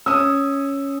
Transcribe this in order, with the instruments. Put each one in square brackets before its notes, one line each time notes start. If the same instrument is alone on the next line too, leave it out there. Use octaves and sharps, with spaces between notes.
[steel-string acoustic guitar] C#4 [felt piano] D#6 E6